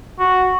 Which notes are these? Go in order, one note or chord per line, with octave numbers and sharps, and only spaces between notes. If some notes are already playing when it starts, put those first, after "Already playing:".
F#4